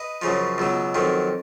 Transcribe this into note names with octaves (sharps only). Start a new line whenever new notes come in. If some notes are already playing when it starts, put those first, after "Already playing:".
Already playing: B4 D#5
F#2 C#3 F3
C#2 B2 F#3
F2 D#3 F#3